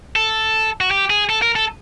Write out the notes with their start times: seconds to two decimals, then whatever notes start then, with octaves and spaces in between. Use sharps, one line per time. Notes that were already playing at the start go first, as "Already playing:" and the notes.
0.16 A4
0.81 F#4
0.91 G4
1.10 G#4
1.29 A4
1.42 A#4
1.55 A4